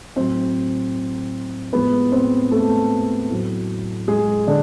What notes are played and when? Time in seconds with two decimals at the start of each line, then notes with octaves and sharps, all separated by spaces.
0.16 A2 F#3 C4 C5
1.73 A2 F3 G#3 B3 B4
2.12 C4 C5
2.51 A3 A4
3.30 A2 F#3
4.08 G#3 G#4
4.47 D3 D4